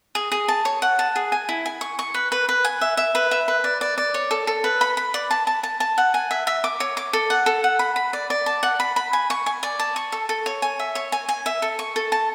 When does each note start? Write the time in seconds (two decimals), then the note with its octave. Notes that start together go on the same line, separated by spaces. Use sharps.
0.15 G#4
0.32 G#4
0.48 A5
0.65 C#5
0.82 F#5
0.99 A5
1.16 G#4
1.32 G#5
1.49 E4
1.66 G#5
1.81 C#6
1.99 C#6
2.14 B4
2.32 B4
2.49 B4
2.65 G#5
2.81 E5
2.97 E5
3.15 B4
3.31 E5
3.48 B4
3.64 D5
3.81 D5
3.98 D5
4.14 C#5
4.31 A4
4.47 A4
4.64 B4
4.81 B5
4.97 B5
5.14 D5
5.31 A5
5.47 A5
5.63 A5
5.80 A5
5.98 F#5
6.14 G#5
6.31 E5
6.47 E5
6.64 D6
6.80 C#5
6.97 D6
7.13 A4
7.30 F#5
7.46 A4
7.64 F#5
7.79 B5
7.96 B5
8.13 D5
8.30 D5
8.46 A5
8.63 F#5
8.80 B5
8.96 B5
9.13 G#5
9.30 C#6
9.46 G#5
9.63 D5
9.79 A5
9.96 C#6
10.12 A4
10.29 A4
10.46 C#5
10.62 G#5
10.79 E5
10.95 C#5
11.12 G#5
11.29 G#5
11.46 E5
11.62 A4
11.79 C#6
11.96 A4
12.12 A5